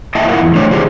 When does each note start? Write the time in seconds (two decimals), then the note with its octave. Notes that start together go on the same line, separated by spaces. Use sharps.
0.15 A#3 E4 D#5 E5 G5 A5
0.28 E4 F4 A#4 F#5
0.41 E2
0.55 A3 D4 C5 C#5 D#5
0.71 D#3 D4 F4 G4 G#4 C5